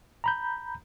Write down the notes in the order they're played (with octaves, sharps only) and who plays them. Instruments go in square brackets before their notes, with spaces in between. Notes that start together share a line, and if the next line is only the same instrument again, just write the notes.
[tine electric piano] A#5 B5 G6